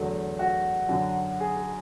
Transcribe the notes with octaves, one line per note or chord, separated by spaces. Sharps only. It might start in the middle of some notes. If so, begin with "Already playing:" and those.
Already playing: E2 D3 F#3 A3 A4
F#4
F#2 D3 F#3
G#4
G#4